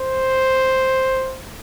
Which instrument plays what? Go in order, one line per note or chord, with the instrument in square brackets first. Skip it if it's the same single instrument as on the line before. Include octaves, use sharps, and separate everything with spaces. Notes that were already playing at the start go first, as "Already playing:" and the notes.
Already playing: [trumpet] C5